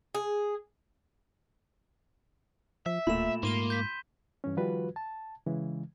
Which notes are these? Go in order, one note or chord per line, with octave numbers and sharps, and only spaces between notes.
G#4
F3 E5
D1 A#2 A3 B5 E7
G#2 A#3 C6 D#7 G7
G6 B6
G2 E3 C#4
D#3 F3 G3 F4 F#4 B4
A5
C#3 E3 G#3